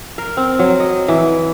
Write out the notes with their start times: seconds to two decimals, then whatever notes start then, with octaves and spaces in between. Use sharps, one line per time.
0.18 A#4
0.37 C4
0.59 F#3
0.80 D#5
1.08 E3